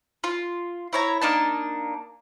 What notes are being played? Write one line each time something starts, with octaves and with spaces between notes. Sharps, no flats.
F4
E4 C#5 A#5
A#3 D4 D#4 A5